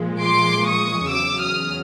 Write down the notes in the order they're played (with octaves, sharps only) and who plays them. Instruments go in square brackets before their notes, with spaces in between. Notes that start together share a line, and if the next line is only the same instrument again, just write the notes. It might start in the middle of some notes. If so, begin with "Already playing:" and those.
Already playing: [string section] A#2 F3 G#3
C6 D6
C#6 D#6
E2 C#3 F#3 D6 E6
D#6 F6